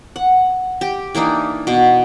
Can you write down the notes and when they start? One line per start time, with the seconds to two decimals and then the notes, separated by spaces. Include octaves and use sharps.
0.16 F#5
0.81 G4
1.15 E3 A#3 D4 D#4
1.67 B2